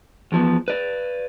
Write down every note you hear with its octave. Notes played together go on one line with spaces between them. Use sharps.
E2 F3 B3
B4 D5